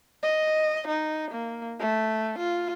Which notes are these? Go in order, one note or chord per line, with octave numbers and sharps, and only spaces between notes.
D#5
D#4
A#3
A3
F4